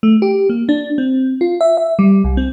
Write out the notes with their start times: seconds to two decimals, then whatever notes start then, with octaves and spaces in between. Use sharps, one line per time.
0.03 A3
0.22 G4
0.50 A#3
0.69 D4
0.98 C4
1.41 F4
1.61 E5
1.77 E5
1.99 G3
2.24 C2
2.37 C4